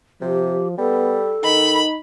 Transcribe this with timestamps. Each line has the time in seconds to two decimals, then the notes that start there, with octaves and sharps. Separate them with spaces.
0.21 C3 F3 G4
0.78 G3 B3 A4
1.44 D#3 D#4 B5